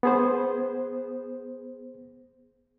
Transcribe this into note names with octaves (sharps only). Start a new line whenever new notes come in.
B3 G#4 C5